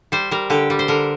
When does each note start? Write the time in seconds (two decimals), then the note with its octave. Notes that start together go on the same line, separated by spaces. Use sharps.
0.12 G3 C5
0.31 G3 A#4
0.50 D3 G4
0.70 G3
0.79 C5
0.88 D3 A#4